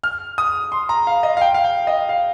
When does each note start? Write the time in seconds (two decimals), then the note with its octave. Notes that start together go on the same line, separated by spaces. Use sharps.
0.04 F6
0.38 D#6
0.72 C6
0.89 A#5
1.07 F5
1.23 D#5
1.37 F5
1.41 G5
1.54 F5
1.64 G5
1.87 D#5
2.09 F5